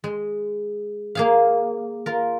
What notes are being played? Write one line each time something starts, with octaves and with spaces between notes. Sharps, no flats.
G#3
A#3 G#4 F5
F4 A#4